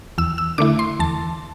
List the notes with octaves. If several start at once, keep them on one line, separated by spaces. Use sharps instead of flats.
E2 E6
E6
D3 A3 E4 D6
C6
E2 A5